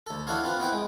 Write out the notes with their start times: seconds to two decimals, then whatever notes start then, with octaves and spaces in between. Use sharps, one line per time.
0.07 D2 A4
0.27 D4 E4 F#4 A4 C#5 F5
0.43 C4 F4 B4
0.59 B3 C4 E4 B4 G5
0.72 G#3